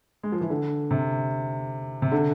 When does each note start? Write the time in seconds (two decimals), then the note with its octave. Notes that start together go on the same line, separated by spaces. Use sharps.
0.23 G#3
0.32 F3
0.41 E3
0.50 D3
0.91 C3
2.02 C3
2.12 D3